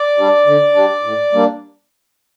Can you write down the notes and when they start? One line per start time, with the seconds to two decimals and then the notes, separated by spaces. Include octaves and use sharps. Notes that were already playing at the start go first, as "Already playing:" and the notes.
Already playing: D5
0.17 G3 D4
0.46 D3
0.75 G3 D4
1.03 A2
1.33 G3 A#3 D4